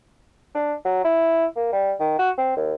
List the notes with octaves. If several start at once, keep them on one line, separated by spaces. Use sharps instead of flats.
D4
F#3
E4
A#3
G3
D#3
F#4
C4
D#2